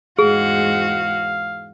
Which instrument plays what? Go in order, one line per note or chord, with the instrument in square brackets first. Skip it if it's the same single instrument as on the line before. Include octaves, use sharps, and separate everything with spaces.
[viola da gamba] E2 G#2 F#4 [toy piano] G#4 [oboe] F5